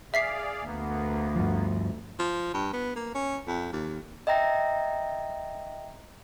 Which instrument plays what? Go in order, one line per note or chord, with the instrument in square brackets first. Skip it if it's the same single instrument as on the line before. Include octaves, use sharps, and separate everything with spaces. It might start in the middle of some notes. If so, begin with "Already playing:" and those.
[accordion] G#4 D5 F5 [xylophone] E5 B6 C7
[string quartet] D2 [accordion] A#3 B3
[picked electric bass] G2 F3
[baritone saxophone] F3
G2
B3
A#3
C#4
F2
D#2
[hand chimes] D#5 E5 G5 A#5 A#6